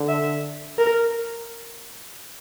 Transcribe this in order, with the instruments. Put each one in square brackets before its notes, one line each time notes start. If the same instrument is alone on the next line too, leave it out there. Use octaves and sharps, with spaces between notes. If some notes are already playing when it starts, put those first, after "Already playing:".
Already playing: [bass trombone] D3
[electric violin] E5
A#4